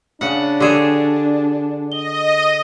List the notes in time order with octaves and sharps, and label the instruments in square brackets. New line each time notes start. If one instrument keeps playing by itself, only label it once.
[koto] C#3 F#5 [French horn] D4
[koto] D3 G#4 [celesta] G4 D5 E7
[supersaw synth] D#5 [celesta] G7